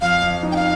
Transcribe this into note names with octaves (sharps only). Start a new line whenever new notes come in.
F2 F5
F2
D#4
G5
F5